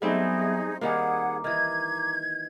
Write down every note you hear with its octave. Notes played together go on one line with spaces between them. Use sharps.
F#3 G3 A3 B3 C4 D#4 G#4 E5
D#3 G3 A#3 G#4 F#5 A#5 D6
D#3 E3 G#6